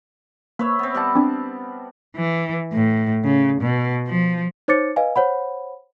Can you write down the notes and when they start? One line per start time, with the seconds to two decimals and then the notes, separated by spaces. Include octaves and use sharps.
0.59 A#3 B4 C#5 E5
0.79 B3 C4
0.94 G3 F#5 A5
1.15 C4 D4
2.16 E3
2.73 A2
3.25 C#3
3.61 B2
4.07 F3
4.68 D#4 C5 C#5 D6 A6 C#7
4.96 B4 D#5 F5 G#5
5.16 C5 C#5 F#5 B5